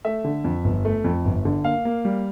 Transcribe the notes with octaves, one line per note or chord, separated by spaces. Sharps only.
A3 E5
D3
F2
G1
A3
F2
G1
D3
A#3 F5
A#3
G3